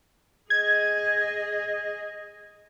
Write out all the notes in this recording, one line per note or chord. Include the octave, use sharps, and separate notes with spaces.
G#4 D#5 G#6